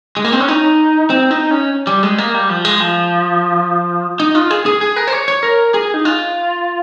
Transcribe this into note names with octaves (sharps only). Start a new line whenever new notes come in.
G#3
A#3
C4
C#4
D#4
C4
D#4
C#4
G3
G#3
A#3
G3
F3
G#3
F3
D#4
F4
G#4
G#4
G#4
A#4
C5
C#5
C#5
A#4
G#4
D#4
F4